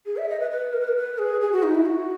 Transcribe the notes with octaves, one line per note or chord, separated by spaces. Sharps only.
G#4
E5
D#5
B4
B4
A#4
B4
A#4
B4
G#4
G#4
F#4
D#4
E4
F#4